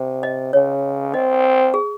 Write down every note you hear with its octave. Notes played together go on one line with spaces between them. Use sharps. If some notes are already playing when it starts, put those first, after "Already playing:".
Already playing: C3
D#5
C#3 C#5
C4 D#5
G#4